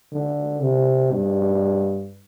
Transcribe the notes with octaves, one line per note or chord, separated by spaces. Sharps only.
D3
C3
G2